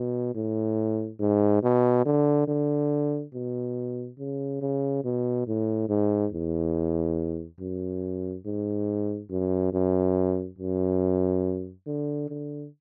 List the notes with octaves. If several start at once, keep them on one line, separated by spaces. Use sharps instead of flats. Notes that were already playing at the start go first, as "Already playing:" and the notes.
Already playing: B2
A2
G#2
B2
D3
D3
B2
C#3
C#3
B2
A2
G#2
E2
F#2
G#2
F#2
F#2
F#2
D3
D3